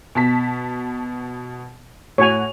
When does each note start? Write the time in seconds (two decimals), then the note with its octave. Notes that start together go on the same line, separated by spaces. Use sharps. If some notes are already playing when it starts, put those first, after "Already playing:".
0.15 B2 A5 B6
2.18 A2 F#4 C#5 G#5 F7